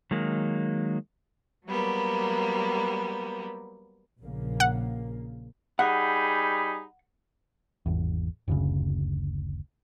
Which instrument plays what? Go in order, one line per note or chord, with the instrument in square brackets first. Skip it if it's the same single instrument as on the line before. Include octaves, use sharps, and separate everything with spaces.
[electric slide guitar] D#3 F#3 G#3 A#3
[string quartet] F#3 G3 A#3 B3
[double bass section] A#1 C#3 A#3
[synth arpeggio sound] F#5
[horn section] G3 D#4 G#4 [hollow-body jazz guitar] F#5 [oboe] B5
[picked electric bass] G#1 E2
F#1 D2 C#3